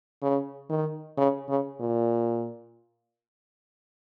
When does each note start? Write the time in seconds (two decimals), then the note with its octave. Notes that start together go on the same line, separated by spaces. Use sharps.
0.22 C#3
0.70 D#3
1.17 C#3
1.49 C#3
1.80 A#2